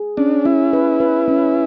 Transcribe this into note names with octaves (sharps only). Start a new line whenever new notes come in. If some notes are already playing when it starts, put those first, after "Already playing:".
Already playing: G#4
C#4 D4
C#4 E4
B4
B4
C#4